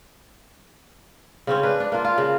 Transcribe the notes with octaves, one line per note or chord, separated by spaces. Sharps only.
C#3 C4 C#4
D4 B4
D4
A#3 F4
F4
C#3